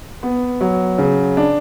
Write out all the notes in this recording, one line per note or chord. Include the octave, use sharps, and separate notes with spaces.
B3
F#3
C#3
D4